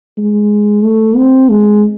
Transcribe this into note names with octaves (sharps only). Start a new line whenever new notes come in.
G#3
A3
C4
G#3